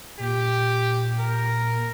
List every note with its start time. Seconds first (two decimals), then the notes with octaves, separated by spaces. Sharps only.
0.19 A#2 G4
1.19 A#4